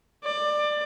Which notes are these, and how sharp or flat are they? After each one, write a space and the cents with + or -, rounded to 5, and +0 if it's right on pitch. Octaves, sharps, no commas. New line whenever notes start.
D5 +20